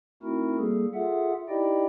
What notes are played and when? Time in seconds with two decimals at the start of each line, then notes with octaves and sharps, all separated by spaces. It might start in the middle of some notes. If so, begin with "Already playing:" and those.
0.23 A3 C4 D#4 E4 F#4 A#4
0.58 G3 A#3 G#4 A4
0.94 F4 G#4 A4 E5 F#5
1.49 D#4 E4 G4 D5 D#5 G5